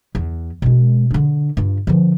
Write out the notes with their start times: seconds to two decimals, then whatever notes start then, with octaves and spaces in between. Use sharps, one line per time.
0.15 E2
0.62 B2 G#3
1.11 D3 D4
1.57 G2 F4
1.87 D3 F3